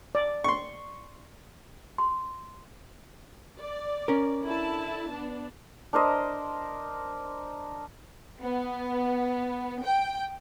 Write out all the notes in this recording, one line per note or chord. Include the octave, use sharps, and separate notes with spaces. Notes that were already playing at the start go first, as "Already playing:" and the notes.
D5
C6 C#6
C6
D5
C#4 A#4
D3 E4 A5
B3 D4
D4 A#4 C5 D#5
B3
G5